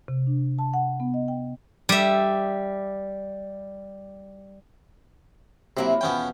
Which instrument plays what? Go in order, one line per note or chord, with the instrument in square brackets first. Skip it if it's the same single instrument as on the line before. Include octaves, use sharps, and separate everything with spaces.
[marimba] C3
D4
A5
F#5
B3
D#5
G5
[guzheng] G3 E5
[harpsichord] C3 [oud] F#3 A#3 E4
[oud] E2 B2 F3 [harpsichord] B3 C#4 G5